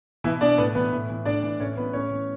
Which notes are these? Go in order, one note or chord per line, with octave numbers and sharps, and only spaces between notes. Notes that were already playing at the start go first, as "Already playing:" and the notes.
B2 E3 E4
B2 D4 D5
A2 B3 B4
E3 B3 B4
A2
E3
A2 D4 D5
E3
A2 C#4 C#5
E3 B3 B4
A2 C#4 C#5
E3